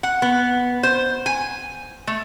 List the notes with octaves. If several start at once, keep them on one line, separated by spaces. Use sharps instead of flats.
F#5
B3
C5
G#5
A3